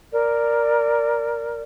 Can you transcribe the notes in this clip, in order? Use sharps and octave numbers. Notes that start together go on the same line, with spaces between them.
A#4 D5